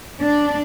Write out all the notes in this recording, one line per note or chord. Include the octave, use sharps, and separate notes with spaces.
D4